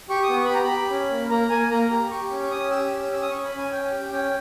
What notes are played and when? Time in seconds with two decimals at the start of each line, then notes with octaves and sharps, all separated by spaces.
0.10 G4 C#6
0.23 D#6
0.29 B3
0.37 C#6
0.45 B5
0.50 G4 A#5
0.64 B5
0.70 G4
0.90 C#4
1.10 A#3
1.30 A#3 A#5
1.50 A#3 G#5
1.70 A#3 A#5
1.91 G4
2.11 G4 C#6
2.30 C#4
2.43 C#6
2.51 C#4 D#6
2.70 G4 E6
2.91 C#4
3.11 C#4 E6
3.22 D#6
3.31 C#4 C#6
3.45 B5
3.51 C#4
3.58 G#5
3.71 C#4 G5
3.91 G4
4.12 C#4 G5